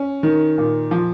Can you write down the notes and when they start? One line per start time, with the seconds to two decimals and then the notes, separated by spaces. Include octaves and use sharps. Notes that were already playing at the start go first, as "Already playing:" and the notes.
Already playing: C#4
0.23 D#3
0.58 A#2
0.91 F3